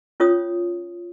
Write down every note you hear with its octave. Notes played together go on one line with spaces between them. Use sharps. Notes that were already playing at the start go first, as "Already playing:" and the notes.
C#4 F4 C#5 D#6